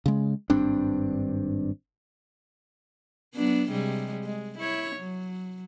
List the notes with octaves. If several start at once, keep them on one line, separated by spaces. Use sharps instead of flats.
C#3 G#3
G#1 G2 C4 D4
F#3 B3 D4
C3 G3 G#3
G#3
E4 C#5
F#3